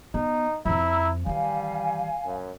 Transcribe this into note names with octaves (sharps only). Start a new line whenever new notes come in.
B3 D#4
F2 F3 E4 A#5 E6
D#3 E3 G3 F5 G#5
F#2